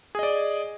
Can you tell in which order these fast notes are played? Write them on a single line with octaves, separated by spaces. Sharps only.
G#4 D#5 D5